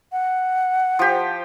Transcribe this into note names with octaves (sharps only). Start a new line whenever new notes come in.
F#5
F3 G4